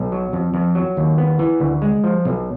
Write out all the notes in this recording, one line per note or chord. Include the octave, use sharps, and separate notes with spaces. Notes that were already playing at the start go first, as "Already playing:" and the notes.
Already playing: B1
F#3
F2
F2
F#3
D#2
B3
E3
D2
G#3
F3
B1